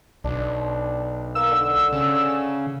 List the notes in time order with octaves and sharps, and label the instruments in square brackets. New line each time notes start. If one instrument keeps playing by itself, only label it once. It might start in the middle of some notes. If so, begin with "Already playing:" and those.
[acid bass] B1 [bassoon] D4
[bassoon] A#3 [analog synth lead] E6
[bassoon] D3
[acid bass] C#3